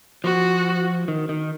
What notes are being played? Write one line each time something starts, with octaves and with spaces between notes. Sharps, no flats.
F3 F#4
D#3
D#3